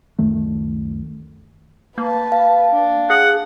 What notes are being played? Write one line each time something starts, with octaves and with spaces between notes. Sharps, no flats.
C#2 F#2 D#3 A3
A#3 B4 A5
F5
D4
G#4 F#5